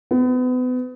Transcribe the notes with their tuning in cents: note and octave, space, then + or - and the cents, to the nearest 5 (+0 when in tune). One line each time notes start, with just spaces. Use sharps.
B3 +35